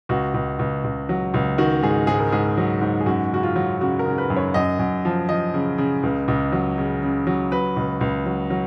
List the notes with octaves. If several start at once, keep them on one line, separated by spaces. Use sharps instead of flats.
C#2 F#4
C#2
C#2
C#2
F#3
C#2
D#3 F#4
G#2 G#4
G#2 G#4
A#4
G#2 G#4
F#3
G#2
G#4
F#2 F#4
C#3 F#4
F4
F#3
C#3 F#4
A#4
C#3
B4
F#2
C#5
F#2 D#5
F#2
F3
F3 D#5
C#3
C#3
C#2
C#2
F#3
C#3
C#3
F#3
F#3 B4
C#2
C#2
F#3
F#3